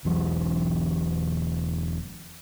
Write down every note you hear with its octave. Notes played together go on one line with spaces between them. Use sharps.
E1 E3 F#3